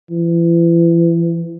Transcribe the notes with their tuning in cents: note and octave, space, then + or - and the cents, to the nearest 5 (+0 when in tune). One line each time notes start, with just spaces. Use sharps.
E3 +35